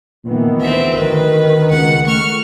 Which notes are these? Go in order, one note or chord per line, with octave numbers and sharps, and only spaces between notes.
A#2 D#3 E3 B3
D2 C4 E5
D#3 B4
C#2 F#5
A3 C#6 F6